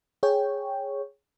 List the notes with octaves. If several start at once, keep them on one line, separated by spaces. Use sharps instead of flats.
G#4 C#5 G5